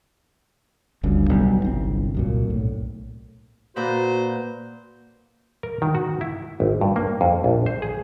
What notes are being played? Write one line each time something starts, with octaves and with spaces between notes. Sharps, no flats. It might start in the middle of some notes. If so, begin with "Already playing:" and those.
G1 D2 G2 C#3
B1 B2 F#3 G3
G1 C2 C4
C2 F#2 A#2
B1 A2
A#2 F#4 B4 C5
A#4
D#3
F#4
E4
G#1
G2
A#3
F2
A#1
C5
G#4